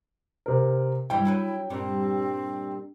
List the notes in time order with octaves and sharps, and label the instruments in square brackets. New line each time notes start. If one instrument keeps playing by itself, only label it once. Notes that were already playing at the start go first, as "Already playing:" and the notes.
[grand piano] C3 A#4
[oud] G2 E3 G3 [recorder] E4 [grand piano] G5
[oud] F#3 A4 B4
[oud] G2 A#2 G3 [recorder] C4